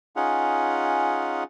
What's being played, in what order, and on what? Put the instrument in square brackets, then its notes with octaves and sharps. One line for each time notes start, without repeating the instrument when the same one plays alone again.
[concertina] C#4 D#4 F4 G#4 F#5